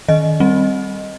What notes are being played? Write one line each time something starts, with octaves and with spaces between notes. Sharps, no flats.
D#3 D#5
G3 C4